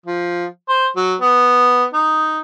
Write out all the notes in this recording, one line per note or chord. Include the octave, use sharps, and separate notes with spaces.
F3
C5
F#3
B3
D#4